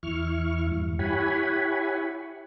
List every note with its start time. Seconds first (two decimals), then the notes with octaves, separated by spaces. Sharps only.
0.03 E2 E4 C#6 F6
0.72 E2 G2
0.99 E4 G4 C#5 F#5 G#5 B5